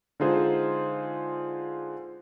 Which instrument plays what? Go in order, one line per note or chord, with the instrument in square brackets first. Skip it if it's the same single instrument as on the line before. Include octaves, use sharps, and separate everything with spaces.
[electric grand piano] D3 G#3 D#4 F4 G#4 C5